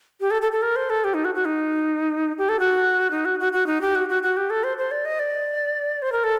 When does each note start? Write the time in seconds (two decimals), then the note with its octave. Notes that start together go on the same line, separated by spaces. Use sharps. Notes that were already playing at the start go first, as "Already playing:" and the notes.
0.21 G4
0.31 A4
0.42 A4
0.52 A4
0.62 A#4
0.76 C5
0.90 A4
1.04 G4
1.14 D#4
1.25 F#4
1.35 F#4
1.45 D#4
2.38 G4
2.49 A4
2.60 F#4
3.11 D#4
3.25 F#4
3.40 F#4
3.53 F#4
3.67 D#4
3.81 G4
3.95 F#4
4.09 F#4
4.23 F#4
4.37 G4
4.50 A4
4.64 C5
4.78 C5
4.91 D5
5.05 D#5
5.19 D5
6.02 C5
6.12 A#4
6.24 A4